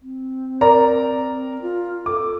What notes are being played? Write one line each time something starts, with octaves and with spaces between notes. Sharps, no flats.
C4
A#4 D5 A#5
F4
A4 D6